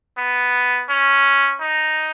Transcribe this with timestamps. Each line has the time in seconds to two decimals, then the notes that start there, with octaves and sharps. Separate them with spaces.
0.18 B3
0.89 C#4
1.60 D#4